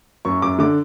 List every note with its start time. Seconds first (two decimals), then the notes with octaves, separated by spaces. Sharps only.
0.25 F#2 C#6
0.42 F#2 D6
0.59 D3 D6